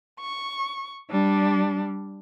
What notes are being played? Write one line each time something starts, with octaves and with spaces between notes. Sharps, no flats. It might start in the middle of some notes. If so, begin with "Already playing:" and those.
C#6
G3 D4